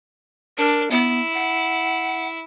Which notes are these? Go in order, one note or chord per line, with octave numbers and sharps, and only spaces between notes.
D4 A#4
B3 E4
F#5